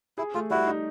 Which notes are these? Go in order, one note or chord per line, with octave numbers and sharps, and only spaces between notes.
E4 G#4
A3 F4
G3 E4 F#4
D#4